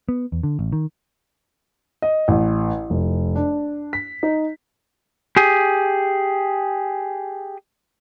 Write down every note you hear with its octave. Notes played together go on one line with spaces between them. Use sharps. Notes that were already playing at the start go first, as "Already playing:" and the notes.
B3
E2
D3
A1
D#3
D#5
A1
F1
D4
B6
D#4
G4 G#4